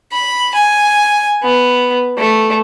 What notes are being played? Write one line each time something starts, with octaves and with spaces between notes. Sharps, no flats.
B5
G#5
B3
A3